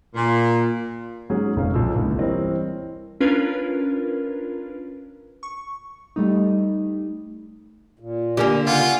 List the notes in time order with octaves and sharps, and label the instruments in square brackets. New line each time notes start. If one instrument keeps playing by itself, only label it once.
[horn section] A#2
[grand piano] G#2 F#3 C#4 G#4
F1 G#2 G#3 C#4 F5
B1 F3 E6
G1 C#2 A#3 E4
E3 G3 C4 A#4 C#5 D#5
[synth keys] C#4 D4 F4 A#4 B4
C#6
[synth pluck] G3 A3 D#4
[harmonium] A#2
[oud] D3 A#3 [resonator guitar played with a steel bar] G4 A#4 G#5
[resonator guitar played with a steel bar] C#3 [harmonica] F4 [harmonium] F#5 G#5